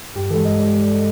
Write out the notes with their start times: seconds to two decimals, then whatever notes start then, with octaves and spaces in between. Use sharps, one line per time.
0.15 G2 G4
0.30 E3 G#3 A4
0.45 G2 D#5
0.60 E3 G#3 D5